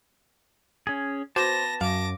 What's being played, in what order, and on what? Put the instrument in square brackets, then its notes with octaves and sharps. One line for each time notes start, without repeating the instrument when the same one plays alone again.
[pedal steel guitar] C#4 G#4
[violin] B3 A#6 [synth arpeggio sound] F#4 D6 E7 [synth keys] C5 [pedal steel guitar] A5
[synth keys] F#2 [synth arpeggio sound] F5 [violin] D6 A#6